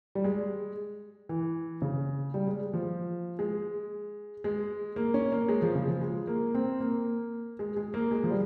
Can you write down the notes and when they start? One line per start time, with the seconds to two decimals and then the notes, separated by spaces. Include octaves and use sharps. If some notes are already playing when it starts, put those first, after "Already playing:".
0.15 G3
0.24 G#3
1.29 E3
1.82 C#3
2.34 G3
2.47 G#3
2.73 F3
3.39 G#3
4.44 G#3
4.96 A#3
5.14 C#4
5.32 A#3
5.49 G#3
5.62 F3
5.75 C#3
5.88 F3
6.02 G#3
6.27 A#3
6.54 C4
6.80 A#3
7.59 G#3
7.77 G#3
7.94 A#3
8.11 G#3
8.24 F3
8.30 G3